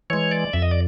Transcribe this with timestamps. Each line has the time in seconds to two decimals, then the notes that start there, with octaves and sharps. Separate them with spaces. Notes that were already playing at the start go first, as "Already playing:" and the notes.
0.10 E3 G#3 C#5
0.31 D5
0.53 F2 E5
0.62 D#5
0.71 D5